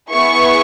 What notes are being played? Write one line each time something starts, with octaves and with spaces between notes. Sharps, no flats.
B3 E4 G#4 C#6